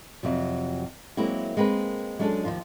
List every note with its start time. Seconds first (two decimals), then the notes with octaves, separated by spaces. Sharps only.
0.23 F2 C3 F#3
1.17 F#3 G#3 A#3 C4 E4
1.57 G#3 A#3 C4 B4
2.19 F#3 G#3 C#4 D4 G#4 A4
2.45 D#2 G#2 D#3 F3 F4